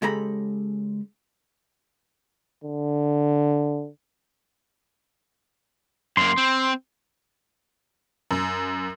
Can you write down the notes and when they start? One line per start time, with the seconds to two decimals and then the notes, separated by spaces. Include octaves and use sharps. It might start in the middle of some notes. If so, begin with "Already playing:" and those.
0.02 C#3 G#3 G4 A4 A#5 B5
2.64 D3
6.17 F#2 A#3 C6
6.38 C4
8.31 F#2